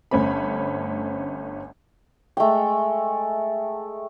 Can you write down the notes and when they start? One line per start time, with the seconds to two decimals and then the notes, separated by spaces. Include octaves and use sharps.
0.11 G1 A3 C#4 C5 B5
2.37 G#3 A3 D#5 G5